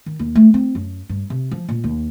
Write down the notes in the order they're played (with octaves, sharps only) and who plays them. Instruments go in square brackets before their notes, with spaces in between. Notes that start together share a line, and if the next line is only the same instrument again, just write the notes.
[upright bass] D#3
D#2
A3
C4
F#2
G2
C3
F3
A#2
D#2